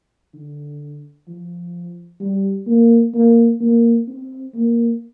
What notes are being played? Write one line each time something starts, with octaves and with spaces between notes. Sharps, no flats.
D3
F3
G3
A#3
A#3
A#3
C4
A#3